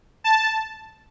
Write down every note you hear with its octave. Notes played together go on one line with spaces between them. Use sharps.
A5